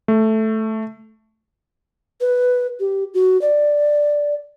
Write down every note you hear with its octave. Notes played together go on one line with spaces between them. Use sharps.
A3
B4
G4
F#4
D5